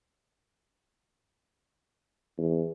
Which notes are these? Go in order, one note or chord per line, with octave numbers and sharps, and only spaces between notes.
E2